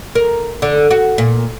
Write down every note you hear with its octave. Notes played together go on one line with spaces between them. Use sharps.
A#4
D3
F#4
A#2